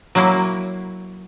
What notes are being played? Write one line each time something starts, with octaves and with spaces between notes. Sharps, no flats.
F#3 A#3 E4